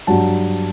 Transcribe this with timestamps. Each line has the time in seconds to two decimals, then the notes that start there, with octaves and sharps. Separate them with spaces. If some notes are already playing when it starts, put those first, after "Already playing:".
0.07 G2 F#3 A5